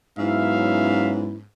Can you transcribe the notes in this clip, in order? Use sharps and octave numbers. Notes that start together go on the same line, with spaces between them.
G#2 F#3 B3 C#4 E4 E5 F5